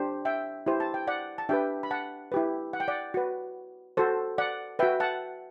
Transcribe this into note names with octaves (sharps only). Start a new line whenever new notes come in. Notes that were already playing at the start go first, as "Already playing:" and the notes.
Already playing: D4 G4 C5
E5 G5
E4 G4 C5
A5
G5
D5 F#5
A5
D4 G4 B4 E5 G5
B5
F#5 A5
E4 G4 B4
F#5
G5
D5 F#5
F#4 B4
F#4 A4 C5
D5 F#5
F#4 B4 E5 G5
F#5 A5